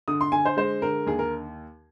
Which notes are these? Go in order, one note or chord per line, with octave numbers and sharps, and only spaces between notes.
D3 D#6
C6
D3 G#5
C5
G#3 C5
D3 A#4
D#2 G#4
A#4